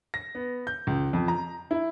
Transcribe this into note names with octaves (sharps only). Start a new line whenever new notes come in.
A#6
B3
G6
C#2
F2
A#5
E4